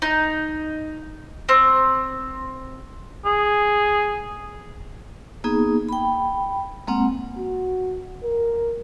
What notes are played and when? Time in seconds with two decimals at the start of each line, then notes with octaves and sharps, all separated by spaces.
0.02 D#4
1.49 C4
3.25 G#4
5.44 A#3 B3 D#4 G#4
5.89 G5 B5
6.87 G#3 A#3 C4 F#5
7.38 F#4
8.24 A#4